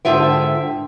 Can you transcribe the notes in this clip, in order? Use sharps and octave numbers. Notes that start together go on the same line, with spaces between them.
G#2 D3 F4 E5 G5